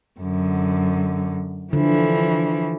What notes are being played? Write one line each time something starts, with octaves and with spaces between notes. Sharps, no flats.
F#2 D3
D3 E3 F3